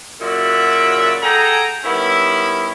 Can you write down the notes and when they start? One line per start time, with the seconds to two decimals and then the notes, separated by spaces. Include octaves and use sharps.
0.21 A#2 C#3 F#3 F#4 D5 E5
1.23 F#4 G#4 A4 G5 G#5 A#5
1.84 D#3 G3 B3 C#4 E4